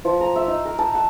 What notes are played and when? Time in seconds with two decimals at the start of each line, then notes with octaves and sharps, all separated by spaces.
0.05 F3
0.21 A#5
0.36 E5
0.48 D#4
0.65 A#4
0.78 A5
0.95 F#5